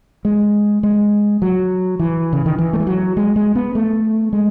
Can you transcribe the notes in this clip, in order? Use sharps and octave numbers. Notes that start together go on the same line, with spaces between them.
G#3
G#3
F#3
E3
C#3
D#3
E3
A3
G#3
F#3
G#3
G#3
B3
A3
G#3